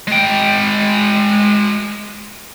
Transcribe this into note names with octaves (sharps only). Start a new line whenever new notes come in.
G#3 G5